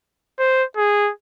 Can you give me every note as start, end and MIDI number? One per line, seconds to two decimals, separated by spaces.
0.39 0.63 72
0.77 1.11 68